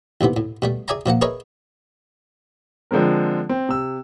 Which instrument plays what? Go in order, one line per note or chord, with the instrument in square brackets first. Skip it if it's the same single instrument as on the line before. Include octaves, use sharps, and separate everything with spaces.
[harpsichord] D#2 A2 C3 B3
A2
B2 G3 A3
G#4 D5 E5 G#5 A#5
A#2 F3 A#3 F#5
G#4 A#4 B4 C#5 D#5 E5
[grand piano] D3 F3 G#3 C4 A#4
C4
C3 E6